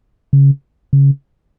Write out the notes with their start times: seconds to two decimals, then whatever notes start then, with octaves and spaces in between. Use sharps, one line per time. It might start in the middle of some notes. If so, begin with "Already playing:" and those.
0.33 C#3
0.93 C#3